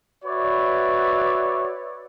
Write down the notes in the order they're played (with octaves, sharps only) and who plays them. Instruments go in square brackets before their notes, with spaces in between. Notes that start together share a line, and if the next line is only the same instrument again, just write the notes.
[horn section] F#4 B4 C#5 D5 E5